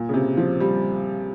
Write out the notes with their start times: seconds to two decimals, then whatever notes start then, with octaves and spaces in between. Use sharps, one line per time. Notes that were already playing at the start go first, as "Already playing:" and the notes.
Already playing: A#2
0.09 C#3
0.14 C3
0.37 F3
0.60 G3